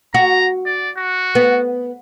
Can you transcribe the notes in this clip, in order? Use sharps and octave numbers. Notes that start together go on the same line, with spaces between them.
F#4 A#5
D5
F#4
B3